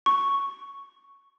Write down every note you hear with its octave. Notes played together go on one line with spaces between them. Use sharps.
C#6